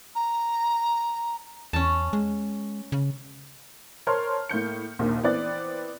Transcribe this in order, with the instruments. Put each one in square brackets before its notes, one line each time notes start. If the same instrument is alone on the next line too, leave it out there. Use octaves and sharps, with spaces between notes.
[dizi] A#5
[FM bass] E2 [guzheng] C#4 A5
[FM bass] G#3
C#3
[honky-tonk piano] A#4 C5 C#5 A5 C6 F6
A2 A#3 G6 C#7
A#1 D#2 A#2
E3 B3 C4 D5 F#6 A6